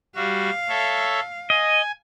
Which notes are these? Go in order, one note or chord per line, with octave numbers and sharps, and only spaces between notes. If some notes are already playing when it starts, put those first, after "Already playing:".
G3 F#4 F5
A4 C#5 E5
D#5 G#5